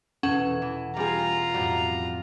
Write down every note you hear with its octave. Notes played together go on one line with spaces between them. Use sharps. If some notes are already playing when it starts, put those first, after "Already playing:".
E2 B2 C#4 A4 F#5 E7
E3
G3 F4 G#4 A#5
F2 A2 G3 C4 F#4 D5